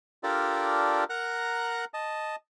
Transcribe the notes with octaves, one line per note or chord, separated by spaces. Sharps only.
D4 F4 G4 A4 A#4 D5
A#4 F#5 A#5 F#6
D#5 A5